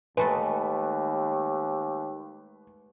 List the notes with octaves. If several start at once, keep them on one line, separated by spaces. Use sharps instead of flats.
D#2 G#3 A3 A4 B4